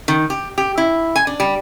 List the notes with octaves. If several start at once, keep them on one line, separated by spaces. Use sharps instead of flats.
D#3
G4
G4
E4
G#5
D4
G3